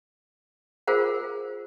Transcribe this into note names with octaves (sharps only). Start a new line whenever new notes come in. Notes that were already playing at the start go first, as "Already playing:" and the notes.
F4 G#4 A#4 C5 F#5